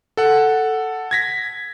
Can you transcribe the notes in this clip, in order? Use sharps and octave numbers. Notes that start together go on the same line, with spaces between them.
A4 F#5
G#6 A#6 B6